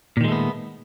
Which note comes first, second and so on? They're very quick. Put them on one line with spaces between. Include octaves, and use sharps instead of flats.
A#2 D#3 G#3 A3 B3